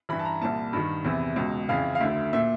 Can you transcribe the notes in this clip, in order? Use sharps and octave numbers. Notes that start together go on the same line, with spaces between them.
G2 E3 B5
A5
A#5
C2 A#2 A5
G2 D#3
E2 C3 E3
C#2 B2
F2 C#3 E3 F5
F5
D2 D3 E5
A#2 E5